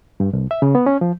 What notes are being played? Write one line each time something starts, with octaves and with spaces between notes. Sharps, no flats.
G2
C2
E5
C#3
B3
C#4
F3